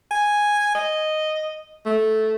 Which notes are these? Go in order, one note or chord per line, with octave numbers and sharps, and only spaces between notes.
G#5
D#5
A3